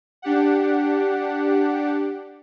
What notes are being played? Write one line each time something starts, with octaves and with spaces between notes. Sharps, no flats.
D4 G4 F#5